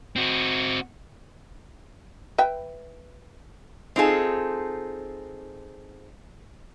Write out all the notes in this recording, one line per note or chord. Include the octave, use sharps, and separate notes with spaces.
C4 F#4
B4 E5 G5
C4 D#4 F4 G#4 A4